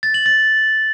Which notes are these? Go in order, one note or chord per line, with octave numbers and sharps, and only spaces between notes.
A6
F#7
A6